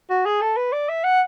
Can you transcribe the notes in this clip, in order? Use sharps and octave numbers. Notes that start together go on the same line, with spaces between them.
F#4
G#4
A4
B4
D5
E5
F#5